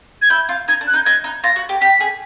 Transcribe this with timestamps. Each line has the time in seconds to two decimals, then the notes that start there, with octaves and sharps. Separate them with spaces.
0.22 G#6
0.30 E4 G6
0.49 F4
0.68 D#4 G#6
0.81 D4
0.87 F#6
0.93 D#4 G6
1.05 D#4 G#6
1.24 D#4
1.44 F4 A#6
1.56 F#4
1.69 G4
1.81 G4 B6
2.00 G#4